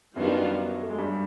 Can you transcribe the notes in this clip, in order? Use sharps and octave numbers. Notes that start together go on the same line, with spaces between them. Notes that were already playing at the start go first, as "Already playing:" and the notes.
F#2 D#3 F#3 G3 B3 D4 F4
A3
G#3
G2 G3